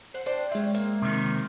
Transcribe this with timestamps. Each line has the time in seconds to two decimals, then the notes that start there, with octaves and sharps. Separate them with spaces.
0.14 C5 F#5
0.26 D4 C5 G5
0.52 G#3 C4 C#4 E5
0.75 A#3
1.02 C3 D#3